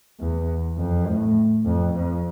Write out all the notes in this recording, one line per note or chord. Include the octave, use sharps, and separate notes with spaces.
E2
F2
A2
F2
F2